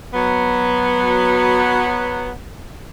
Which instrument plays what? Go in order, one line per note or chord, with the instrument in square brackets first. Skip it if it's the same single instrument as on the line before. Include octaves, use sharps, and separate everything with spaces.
[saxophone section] F#3 B3